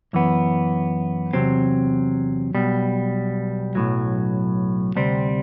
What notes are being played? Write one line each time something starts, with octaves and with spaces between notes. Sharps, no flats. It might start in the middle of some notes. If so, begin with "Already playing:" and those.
F#2 E3 B3
E2 C3 F#3 C4
B1 B2 G3
B1 A2 F#3
D2 C3 G3 C4